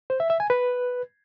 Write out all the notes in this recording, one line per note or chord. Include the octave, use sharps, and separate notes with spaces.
C5
E5
E5
G#5
B4